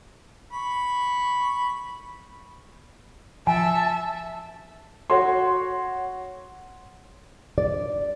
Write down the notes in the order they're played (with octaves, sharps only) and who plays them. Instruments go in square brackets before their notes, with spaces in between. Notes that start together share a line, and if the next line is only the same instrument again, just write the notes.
[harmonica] B5 C#6
[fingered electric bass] F3 [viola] E5 [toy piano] G#5 [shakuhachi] A5
[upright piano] F#4 C#5 C6
[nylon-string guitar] D5